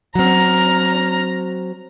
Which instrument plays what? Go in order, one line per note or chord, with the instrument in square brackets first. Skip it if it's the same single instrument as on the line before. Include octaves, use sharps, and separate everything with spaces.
[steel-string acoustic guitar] F#3 C4 [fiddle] A#5 F6